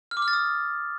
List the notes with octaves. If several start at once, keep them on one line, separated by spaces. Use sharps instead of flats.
F6
D6
F6
A6
D#6